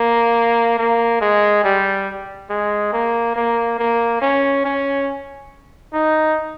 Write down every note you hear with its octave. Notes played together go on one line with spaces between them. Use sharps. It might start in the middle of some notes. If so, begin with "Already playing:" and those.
Already playing: A#3
A#3
G#3
G3
G#3
A#3
A#3
A#3
C#4
C#4
D#4